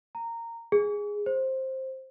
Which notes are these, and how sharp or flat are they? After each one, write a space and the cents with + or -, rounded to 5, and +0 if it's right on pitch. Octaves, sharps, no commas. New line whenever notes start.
A#5 -15
G#4 -10
C5 +10